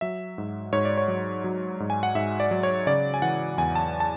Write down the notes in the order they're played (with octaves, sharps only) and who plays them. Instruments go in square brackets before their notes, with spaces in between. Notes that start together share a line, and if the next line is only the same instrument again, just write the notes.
[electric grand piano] F#3 E5
G#2
G#2 C#5
D5
C#5
F#3
F#3
G#2
G#5
F#5
G#2 E5
D5
F#3
C#5
C#3 D5
G#5
E3 F#5
E2 G#5
A5
A5